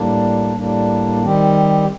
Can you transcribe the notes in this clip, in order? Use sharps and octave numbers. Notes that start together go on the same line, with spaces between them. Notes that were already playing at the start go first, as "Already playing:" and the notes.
Already playing: A2 G3 A#3 D4
A2 G3 A#3 D4
D#3 G3 C4 G4